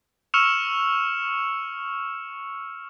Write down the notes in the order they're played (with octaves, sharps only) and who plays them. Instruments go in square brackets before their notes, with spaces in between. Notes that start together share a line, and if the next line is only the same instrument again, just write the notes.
[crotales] C#6 E6 F6 C#7 E7 F7